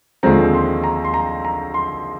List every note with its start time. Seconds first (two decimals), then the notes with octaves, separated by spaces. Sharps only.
0.23 D#2 D3 F3 G#3 C4 A#5
0.54 C6
0.84 A#5
1.05 C6
1.14 A#5
1.45 A#5
1.74 C6